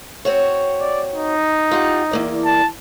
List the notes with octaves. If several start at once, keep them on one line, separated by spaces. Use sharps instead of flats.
C4 F#4 C#5
D5
D#4
F4 G4 F#5
E2 A#3 D5
A5